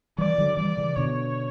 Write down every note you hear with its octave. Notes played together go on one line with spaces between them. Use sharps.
E3 G3 D5
D3 F#3
E3 G3 D5
C#3 E3
B2 D3 C#5